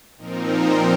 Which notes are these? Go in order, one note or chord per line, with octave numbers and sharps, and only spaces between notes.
A#2 F3 C4 D#4 A#4